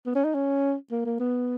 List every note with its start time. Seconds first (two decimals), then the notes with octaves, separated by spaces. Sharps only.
0.06 B3
0.15 C#4
0.24 D#4
0.34 C#4
0.91 A#3
1.05 A#3
1.20 B3